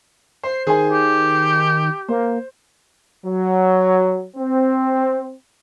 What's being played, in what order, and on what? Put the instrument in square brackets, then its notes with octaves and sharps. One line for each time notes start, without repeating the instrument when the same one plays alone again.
[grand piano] C5 [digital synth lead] C7
[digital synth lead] D#3 [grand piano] G#4 C5 G#5
[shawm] G4
[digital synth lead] A#3 [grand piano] C5
[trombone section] F#3
C4